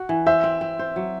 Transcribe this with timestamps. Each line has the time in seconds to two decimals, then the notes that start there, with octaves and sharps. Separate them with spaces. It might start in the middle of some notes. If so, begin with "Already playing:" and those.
Already playing: F#4
0.09 E3
0.26 C5 E5
0.44 C4
0.61 C4
0.79 C5
0.96 F#3